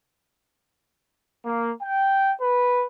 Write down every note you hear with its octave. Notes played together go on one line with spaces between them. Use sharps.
A#3
G5
B4